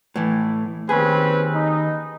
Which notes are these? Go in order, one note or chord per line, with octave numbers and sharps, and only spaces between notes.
A2 E3
D#2 C4 C#4 G#4 B4
D#4